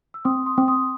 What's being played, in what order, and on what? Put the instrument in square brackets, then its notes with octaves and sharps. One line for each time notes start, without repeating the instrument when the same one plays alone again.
[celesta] E6
[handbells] C4 [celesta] C6 D#6
[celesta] C6 D#6
[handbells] C4
[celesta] C6 D#6